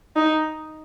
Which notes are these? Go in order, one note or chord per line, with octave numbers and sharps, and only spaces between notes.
D#4